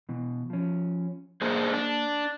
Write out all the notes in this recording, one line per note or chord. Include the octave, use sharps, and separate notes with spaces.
B2 E3
F3 C#4
A#3 D4 G#4 C5
D4